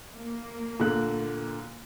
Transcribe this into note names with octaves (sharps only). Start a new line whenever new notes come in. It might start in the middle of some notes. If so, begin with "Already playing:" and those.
A#3
A#2 D3 F#6